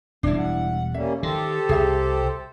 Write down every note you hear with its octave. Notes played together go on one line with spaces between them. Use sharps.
E1 G3 D4 E4
F#5
G3 A#3 C#4 E5
D#3 G4 A4 C5
C2 G#4 E5 A#5